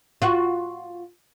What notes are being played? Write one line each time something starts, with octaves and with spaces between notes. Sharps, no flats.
F4 F#4